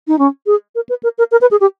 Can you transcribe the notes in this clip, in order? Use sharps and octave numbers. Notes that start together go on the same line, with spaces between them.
D#4
C#4
G#4
A#4
B4
A#4
A#4
A#4
B4
G#4
G4